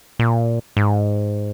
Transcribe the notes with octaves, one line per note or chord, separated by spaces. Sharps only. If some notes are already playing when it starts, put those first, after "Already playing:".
A#2
G#2